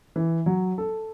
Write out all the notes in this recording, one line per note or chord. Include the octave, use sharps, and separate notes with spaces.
E3
F#3
A4